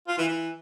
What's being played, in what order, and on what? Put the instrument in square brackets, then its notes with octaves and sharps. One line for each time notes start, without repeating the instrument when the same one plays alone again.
[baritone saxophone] F4
E3
E3